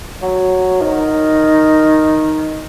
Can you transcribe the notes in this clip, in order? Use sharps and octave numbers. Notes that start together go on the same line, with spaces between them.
F#3
D#3